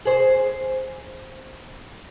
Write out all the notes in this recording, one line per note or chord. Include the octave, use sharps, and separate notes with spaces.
G#4 C5